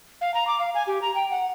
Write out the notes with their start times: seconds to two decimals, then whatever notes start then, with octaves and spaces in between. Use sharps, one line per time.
0.21 F5
0.34 A#5
0.47 D6
0.59 F5
0.75 G#5
0.87 G4
1.02 A#5
1.15 G5
1.30 F#5